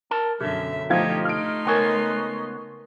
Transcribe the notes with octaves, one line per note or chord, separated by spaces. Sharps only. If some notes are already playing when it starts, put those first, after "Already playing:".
A#4 A5
F#2 B2 D3 G#4 E5
F3 A3 D#4 F4 G4 G#6
A3 D#4 C6 F6 D7
C#2 B3 A#4 C#5 G#5 A5